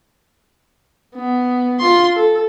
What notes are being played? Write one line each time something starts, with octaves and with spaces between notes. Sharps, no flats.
B3
F4 C6
A4